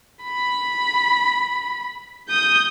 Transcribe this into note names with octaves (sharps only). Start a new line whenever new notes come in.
B5
D#6 G6